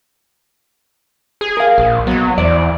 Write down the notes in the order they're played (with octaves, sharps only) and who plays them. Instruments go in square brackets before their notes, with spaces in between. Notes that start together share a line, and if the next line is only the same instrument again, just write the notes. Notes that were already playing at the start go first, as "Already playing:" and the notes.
[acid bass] G#4
[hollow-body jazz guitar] A#4 F5
[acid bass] A#1
[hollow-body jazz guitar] B1 B3 [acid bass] F#3
[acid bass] E2 [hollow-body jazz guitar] C5 D5